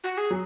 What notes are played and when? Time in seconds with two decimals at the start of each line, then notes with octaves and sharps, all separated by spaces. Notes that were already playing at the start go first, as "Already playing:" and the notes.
0.03 F#4
0.17 G#4
0.30 F#3